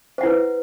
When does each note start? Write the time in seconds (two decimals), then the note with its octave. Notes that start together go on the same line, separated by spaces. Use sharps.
0.18 C5
0.21 F#5
0.23 E4
0.26 B4